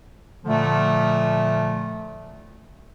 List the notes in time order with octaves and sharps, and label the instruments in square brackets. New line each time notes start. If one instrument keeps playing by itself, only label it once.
[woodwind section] A#2 D3 F3 A3